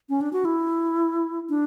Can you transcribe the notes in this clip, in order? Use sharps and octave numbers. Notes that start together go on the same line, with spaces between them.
C#4
D4
F#4
E4
D4